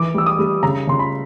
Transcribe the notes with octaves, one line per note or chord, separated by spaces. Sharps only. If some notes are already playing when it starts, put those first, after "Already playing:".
Already playing: E3 D6
G3 E6
D#6
G3
C#3 A#5
C#3 C6
B5